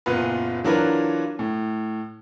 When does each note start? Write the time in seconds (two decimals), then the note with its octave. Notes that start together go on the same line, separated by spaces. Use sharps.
0.06 F#1 A#2 B3 F4 B4
0.64 E3 F#3 D4 F4 A#4 B4
1.39 A2